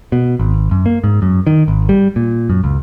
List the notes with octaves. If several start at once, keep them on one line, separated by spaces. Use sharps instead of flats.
B2
G#1
F#2
A#3
G#2
F#2
D#3
G#1
G3
A#2
F#2
C#2